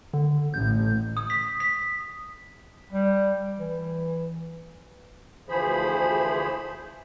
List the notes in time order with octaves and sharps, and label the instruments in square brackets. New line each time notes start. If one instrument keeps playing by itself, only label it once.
[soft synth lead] D3
[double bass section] A1 [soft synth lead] G6
[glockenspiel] D#6
B6
B6
[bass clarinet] G3
E3
[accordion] D2 E3 F3 G#4 C5 B5